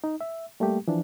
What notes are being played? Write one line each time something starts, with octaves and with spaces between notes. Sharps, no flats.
D#4
E5
G3 A3 A#3 G4
E3 F3 D4